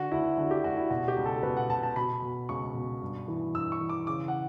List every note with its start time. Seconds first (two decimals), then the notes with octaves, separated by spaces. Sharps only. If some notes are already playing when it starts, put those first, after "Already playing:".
Already playing: D3 F#4
0.12 D2 E4
0.38 D3 F#4
0.51 G4
0.64 D2 F#4
0.77 E4
0.90 B2 F#4
1.08 G4
1.17 C#2
1.26 A4
1.43 B2 B4
1.57 F#5
1.69 B2 A5
1.83 A5
1.96 B2 B5
2.22 B2
2.49 C#2 C#6
2.75 B2
3.02 G2
3.28 E3
3.54 G2 E6
3.72 C#6
3.81 E3
3.89 D6
4.07 C#3 D6
4.28 F#5